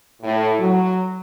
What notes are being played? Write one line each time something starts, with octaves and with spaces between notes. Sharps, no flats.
A2
F#3